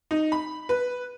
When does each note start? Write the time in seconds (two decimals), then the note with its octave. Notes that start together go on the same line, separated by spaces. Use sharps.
0.11 D#4
0.32 B5
0.69 B4